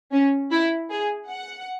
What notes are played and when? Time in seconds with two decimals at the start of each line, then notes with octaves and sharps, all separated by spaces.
0.11 C#4
0.51 E4
0.90 G#4
1.29 F#5